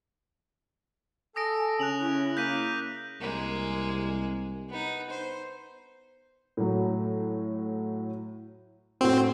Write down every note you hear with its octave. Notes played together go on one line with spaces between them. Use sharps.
A4 G#5 D#6 A#6 D7
C#3 F#6 F7 F#7
C#4 E4
A#3 G6 B6 D#7
C2 G#3 A#3
B3 D#4
C5
A2 F#3
A2 C4 F#4